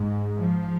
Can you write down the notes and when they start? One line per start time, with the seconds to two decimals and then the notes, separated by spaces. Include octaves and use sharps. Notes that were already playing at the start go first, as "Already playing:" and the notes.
Already playing: G#2
0.39 F3